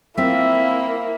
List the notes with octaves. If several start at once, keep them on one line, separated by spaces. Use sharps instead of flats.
A#3 C4 E4 F4 E5